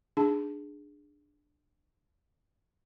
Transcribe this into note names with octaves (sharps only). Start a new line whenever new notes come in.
D4 D#4 G#4 A5